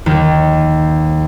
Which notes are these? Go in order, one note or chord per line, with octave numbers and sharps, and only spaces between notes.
D#2